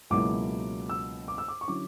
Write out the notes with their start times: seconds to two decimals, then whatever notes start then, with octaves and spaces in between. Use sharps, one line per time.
0.10 C#2 B2 F#3 A#3 E4 D6
0.89 E6
1.28 D6
1.38 E6
1.48 D6
1.61 C#6
1.68 D3 F#3 C#4 E4 D6